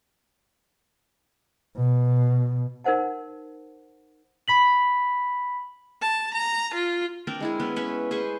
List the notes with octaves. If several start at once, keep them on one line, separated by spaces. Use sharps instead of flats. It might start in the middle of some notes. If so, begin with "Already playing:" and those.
B2
D#4 A#4 C5 F#5 A5
B5 B6 F#7
A5
A#5
F4
C4 D4 A#4 D5
G#3 E4 G#4
B3 C#4 B4
C#4 B4 E5 C#6
G#4 B4 C5 C#6